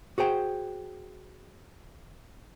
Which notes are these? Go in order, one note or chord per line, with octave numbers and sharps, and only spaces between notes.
F#4 G#4 C5 G5